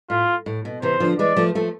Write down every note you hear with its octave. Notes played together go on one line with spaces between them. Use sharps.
A2 F4
A2
B2
C3 E3 C5
D3 F3
E3 G#3 D5
F3 A3
F3 A3